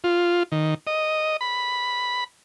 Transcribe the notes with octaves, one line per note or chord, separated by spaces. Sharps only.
F4
D#3
D#5
B5